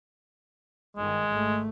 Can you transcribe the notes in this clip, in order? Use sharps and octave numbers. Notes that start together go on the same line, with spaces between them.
G1 D#3 G#3
G#1 A3